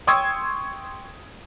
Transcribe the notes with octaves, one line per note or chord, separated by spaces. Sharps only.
G5 C6 C#6 D#6 E6 G#6